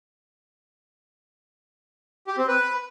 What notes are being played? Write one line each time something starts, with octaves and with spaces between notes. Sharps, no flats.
G4
C4
B4